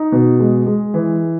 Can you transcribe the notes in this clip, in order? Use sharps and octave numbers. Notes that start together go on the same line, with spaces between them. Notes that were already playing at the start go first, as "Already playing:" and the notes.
Already playing: D#4
B2
G#3
G#3
E3